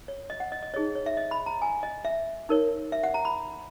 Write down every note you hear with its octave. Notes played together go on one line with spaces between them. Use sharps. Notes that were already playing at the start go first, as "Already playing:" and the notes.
C#5
D#5
F#5
D#5
D#5
D#4 G#4 C#5 D#5
C#5
E5
D#5
B5
A#5
G#5
D#5
E5
D#4 A#4 C#5
E5
F#5
A#5
B5